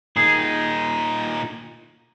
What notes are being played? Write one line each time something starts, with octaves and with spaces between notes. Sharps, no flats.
A#2 D#3 D#4 G#4